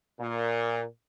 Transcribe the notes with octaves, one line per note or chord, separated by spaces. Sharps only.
A#2